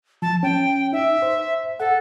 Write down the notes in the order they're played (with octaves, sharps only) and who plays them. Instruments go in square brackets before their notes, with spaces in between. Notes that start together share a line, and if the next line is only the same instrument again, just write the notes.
[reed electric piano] F3 [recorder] A5
[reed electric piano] C#4 [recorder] G5
[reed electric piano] D#4 [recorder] E5
[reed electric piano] C5
[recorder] A4 [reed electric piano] F#5